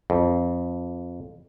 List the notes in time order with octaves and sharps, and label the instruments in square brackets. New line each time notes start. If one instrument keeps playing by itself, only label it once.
[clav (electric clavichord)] F2